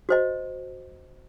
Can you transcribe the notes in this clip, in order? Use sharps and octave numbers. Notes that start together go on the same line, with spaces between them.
F#4 C5 D#5